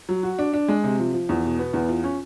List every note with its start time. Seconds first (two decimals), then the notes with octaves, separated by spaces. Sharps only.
0.09 F#3
0.23 F#4
0.39 D4
0.53 D4
0.68 G#3
0.84 C3
0.99 F3
1.14 F3
1.29 E2
1.44 B2
1.59 B3
1.74 E2
1.89 F4
2.04 C#4